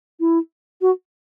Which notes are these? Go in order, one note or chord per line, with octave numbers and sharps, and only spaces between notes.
E4
F#4